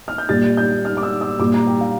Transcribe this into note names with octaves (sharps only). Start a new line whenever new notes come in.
F6
G6
A#2 G3 A6
G6
F6
D6
E6
E6
A#2 G3 D6
A#5
G5
F5